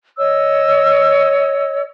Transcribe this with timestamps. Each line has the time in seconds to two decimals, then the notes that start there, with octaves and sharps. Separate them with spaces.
0.18 C#5 D#5 E6